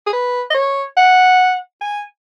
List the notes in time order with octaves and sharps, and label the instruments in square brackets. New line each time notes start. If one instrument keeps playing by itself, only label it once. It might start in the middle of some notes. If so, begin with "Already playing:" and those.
[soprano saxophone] G#4
B4
D#5
C#5
F#5
G#5